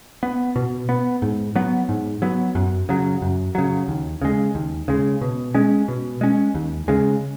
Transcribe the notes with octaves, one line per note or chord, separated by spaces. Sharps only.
B3
B2
B3
G#2
F#3 B3
G#2
F#3 B3
F#2
C#3 F#3
F#2
C#3 F#3
D#2
C#3 G#3
D#2
C#3 G#3
B2
G#3 C#4
B2
G#3 C#4
D#2
C#3 G#3